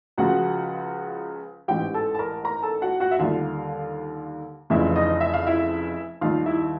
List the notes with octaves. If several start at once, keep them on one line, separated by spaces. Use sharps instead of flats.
C#2 C#3 F3 F#4 F#5
A1 G#2 E3 G4 G5
A4 A5
A5
A#4 A#5
A#4 A#5
A4 A5
F#4 F#5
F#4 F#5
E5
D#2 D3 G3 F4 F5
F1 F2 C#3 E3 E4 E5
D#4 D#5
E5
F5
E4 E5
D#2 D#3 G3 F4 F5
E4 E5